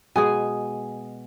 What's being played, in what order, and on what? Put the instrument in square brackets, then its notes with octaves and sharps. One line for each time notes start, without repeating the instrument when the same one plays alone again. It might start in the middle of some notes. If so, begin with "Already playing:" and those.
[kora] B2 G#3 G#4 [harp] G#5